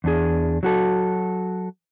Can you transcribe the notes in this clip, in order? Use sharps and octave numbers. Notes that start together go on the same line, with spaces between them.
E2 D4 G#4
F#3 F#4 A4